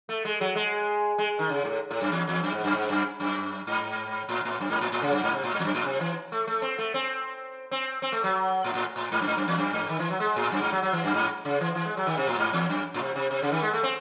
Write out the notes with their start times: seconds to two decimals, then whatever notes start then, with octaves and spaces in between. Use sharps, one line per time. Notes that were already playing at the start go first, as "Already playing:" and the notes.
0.09 A3
0.25 G#3
0.41 F#3
0.56 G#3
1.18 G#3
1.39 D#3
1.49 C#3
1.65 A2
1.91 A2
2.01 F#2
2.12 E2
2.28 E2
2.43 F#2
2.53 G#2
2.64 F#2
2.74 G#2
2.89 F#2
3.20 F#2
3.67 G#2
4.29 A2
4.45 A2
4.60 F#2
4.70 G#2
4.81 A2
4.92 A2
5.02 C#3
5.12 F#2
5.23 G#2
5.33 C3
5.43 A2
5.54 G#2
5.59 E2
5.64 F#2
5.74 A2
5.85 C3
6.00 E3
6.32 A3
6.47 A3
6.62 C4
6.78 A3
6.94 C4
7.71 C4
8.02 C4
8.12 A3
8.24 F#3
8.64 A2
8.75 A2
8.96 A2
9.12 G#2
9.21 F#2
9.27 G#2
9.37 F#2
9.48 E2
9.58 F#2
9.73 G#2
9.89 D#3
9.99 E3
10.10 F#3
10.20 G#3
10.36 A2
10.52 F#2
10.62 G#2
10.72 F#3
10.83 F#3
10.93 E3
11.04 F#2
11.14 G#2
11.45 C#3
11.61 E3
11.75 E3
11.86 G#3
11.97 F#3
12.07 D#3
12.17 C3
12.27 A2
12.38 G#2
12.53 E2
12.69 F#2
12.94 A2
13.00 C3
13.16 C3
13.31 C3
13.42 C#3
13.52 D#3
13.63 G#3
13.73 A3
13.83 C4